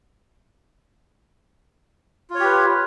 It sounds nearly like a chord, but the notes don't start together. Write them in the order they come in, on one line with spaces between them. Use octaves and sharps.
F4 C#5 G4 B4